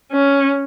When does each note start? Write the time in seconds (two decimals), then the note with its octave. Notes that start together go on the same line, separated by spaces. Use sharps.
0.12 C#4